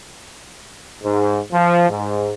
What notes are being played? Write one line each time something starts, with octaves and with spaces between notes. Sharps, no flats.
G#2
F3
G#2